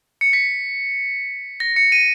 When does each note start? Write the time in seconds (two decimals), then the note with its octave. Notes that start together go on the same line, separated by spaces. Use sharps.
0.21 C#7
0.33 B6
1.60 A#6
1.76 C#7
1.92 D#7